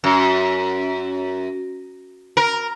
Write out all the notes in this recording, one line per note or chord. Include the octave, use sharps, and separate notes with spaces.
F#2
A#4